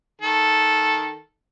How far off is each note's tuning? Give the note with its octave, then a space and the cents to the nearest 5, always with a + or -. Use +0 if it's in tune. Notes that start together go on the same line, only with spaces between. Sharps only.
D#3 +0 A4 -5